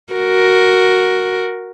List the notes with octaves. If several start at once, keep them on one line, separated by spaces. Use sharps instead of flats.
F#4 A#4